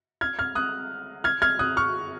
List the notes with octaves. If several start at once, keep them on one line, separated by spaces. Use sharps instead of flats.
F6 G#6
F6 G#6
D#6 F#6
F6 G#6
F6 G#6
D#6 F#6
C#6 F6